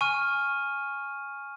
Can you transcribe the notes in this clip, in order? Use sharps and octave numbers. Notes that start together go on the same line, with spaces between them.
G#5 C#6 F6 D#7